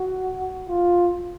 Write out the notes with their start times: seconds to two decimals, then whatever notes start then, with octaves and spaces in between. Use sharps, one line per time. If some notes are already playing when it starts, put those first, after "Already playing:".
Already playing: F#4
0.69 F4